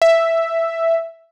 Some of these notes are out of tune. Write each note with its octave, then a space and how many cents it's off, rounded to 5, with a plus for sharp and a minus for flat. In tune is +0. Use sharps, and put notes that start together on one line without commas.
E5 +5